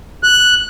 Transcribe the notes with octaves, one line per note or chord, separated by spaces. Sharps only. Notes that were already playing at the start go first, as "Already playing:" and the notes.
F#6